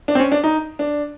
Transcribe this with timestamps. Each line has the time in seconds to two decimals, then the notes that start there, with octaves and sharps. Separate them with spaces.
0.08 D4
0.15 C4
0.19 C#4
0.32 D4
0.44 D#4
0.79 D4